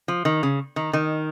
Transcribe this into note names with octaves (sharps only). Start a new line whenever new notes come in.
F3
D#3
C#3
D#3
D#3